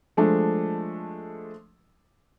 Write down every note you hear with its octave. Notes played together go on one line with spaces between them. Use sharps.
F3 G#3 A3 D4